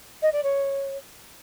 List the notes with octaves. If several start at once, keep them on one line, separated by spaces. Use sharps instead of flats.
D#5
D5
C#5